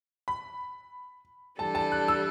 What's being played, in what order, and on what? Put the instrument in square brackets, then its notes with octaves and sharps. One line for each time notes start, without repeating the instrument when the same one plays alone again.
[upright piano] B5
[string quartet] E3 G3 D4 A4 [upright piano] A5
[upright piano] A5
F#6
E6